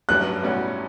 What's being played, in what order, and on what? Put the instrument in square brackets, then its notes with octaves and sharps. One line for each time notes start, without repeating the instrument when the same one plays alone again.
[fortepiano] A1 G2 F#3 [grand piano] F#6
[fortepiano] B1 A2 G3 C#4 F#4